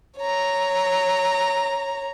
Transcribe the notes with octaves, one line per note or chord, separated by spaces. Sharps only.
C#5 A#5